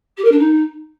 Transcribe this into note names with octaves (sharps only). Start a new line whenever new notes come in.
G4
A#4
D4
D#4